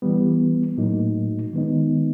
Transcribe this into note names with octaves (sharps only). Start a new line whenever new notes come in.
E3 G3 B3
A2 F#3 A#3 D#4
D#3 G#3 B3 D#4